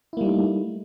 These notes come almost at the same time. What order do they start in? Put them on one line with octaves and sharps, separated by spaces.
E4 A#3 G3 D#4 A3